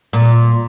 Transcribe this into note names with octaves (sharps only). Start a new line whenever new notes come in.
A#2